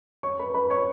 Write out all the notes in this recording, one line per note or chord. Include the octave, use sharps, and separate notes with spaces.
C#5 C#6
B4 B5
B4 B5
C#5 C#6